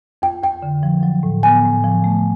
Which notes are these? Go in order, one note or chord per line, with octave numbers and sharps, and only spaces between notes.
F2 G5
F2 G5
D3
F3
F#3
A2
B3 G#5
A2
F3
A3